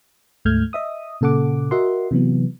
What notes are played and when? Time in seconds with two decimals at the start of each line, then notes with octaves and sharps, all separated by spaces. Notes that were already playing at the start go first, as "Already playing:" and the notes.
0.45 D2 G#2 A3 F6 G6 G#6
0.73 D#5 E5 D#6
1.21 A#2 C#3 A4 F#5 D6
1.71 F#4 A#4 D#5 E5 F#5 C6
2.11 C3 E3 F#3 B3